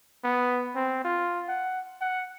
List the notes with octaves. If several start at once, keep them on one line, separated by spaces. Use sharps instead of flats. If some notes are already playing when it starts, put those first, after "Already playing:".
B3
C4
F4
F#5
F#5